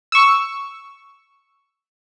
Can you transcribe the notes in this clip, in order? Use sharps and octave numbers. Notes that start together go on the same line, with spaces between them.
C#6 E6